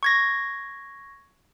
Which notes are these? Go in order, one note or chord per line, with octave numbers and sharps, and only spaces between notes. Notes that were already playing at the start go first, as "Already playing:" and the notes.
C#6 G#6 A#6